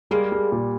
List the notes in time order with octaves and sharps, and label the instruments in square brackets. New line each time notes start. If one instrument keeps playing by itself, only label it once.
[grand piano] G3 [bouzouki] G#3 A#3
[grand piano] G3
A#2